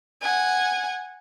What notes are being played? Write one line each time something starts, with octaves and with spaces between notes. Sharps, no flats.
F#5 G#5